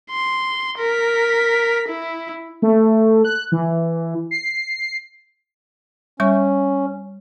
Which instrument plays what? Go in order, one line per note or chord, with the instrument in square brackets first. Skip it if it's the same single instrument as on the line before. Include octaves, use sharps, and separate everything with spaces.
[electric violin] C6
A#4 B6
E4
[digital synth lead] A3
F#6
E3
C7
[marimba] G3 E5 C#6 [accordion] C#4